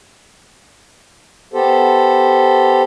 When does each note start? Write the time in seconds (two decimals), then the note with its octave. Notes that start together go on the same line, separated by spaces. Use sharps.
1.54 B3 G4 A4 C5